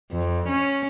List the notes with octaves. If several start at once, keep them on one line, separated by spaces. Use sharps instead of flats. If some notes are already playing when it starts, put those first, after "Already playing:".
F2
C#4